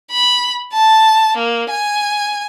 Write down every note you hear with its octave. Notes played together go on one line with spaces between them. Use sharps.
B5
A5
A#3
G#5